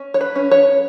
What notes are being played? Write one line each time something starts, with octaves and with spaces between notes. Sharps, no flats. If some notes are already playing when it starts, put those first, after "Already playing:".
Already playing: C#4
C#5
B4
C#4
C#5